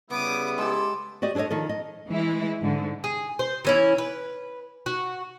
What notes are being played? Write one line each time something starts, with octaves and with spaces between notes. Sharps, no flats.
C#3 G3 B3 E4 D6 D#6
G#3 G4 A4
F#4 G4 D5 D#5
D4 G#4 A4 C#5 D#5
D#3 F3 A4
D#5
E3 G#3 E4
G#2 D3
G#4
C5
E3 C#4 E4
B4
F#4